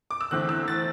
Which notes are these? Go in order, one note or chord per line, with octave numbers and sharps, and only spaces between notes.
D6
E6
E2 D3 A3 C4 F#6
E6
A6